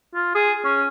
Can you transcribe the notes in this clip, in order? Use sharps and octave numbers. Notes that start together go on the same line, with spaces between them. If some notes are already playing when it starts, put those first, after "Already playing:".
F4
G#4
C#4